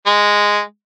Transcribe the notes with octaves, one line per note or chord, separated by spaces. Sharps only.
G#3